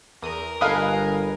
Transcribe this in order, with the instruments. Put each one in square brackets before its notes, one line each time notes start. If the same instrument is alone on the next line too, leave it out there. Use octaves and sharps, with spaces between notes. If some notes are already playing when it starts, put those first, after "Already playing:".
[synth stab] E2 D#6 [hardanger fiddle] A#4
[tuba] G1 [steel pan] A4 F5 D#6 [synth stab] B4 D#5 G#5